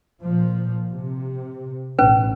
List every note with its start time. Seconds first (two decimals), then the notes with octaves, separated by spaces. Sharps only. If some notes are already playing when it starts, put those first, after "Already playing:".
0.21 A#2 F3
0.91 C3
1.99 A1 B2 C#4 B4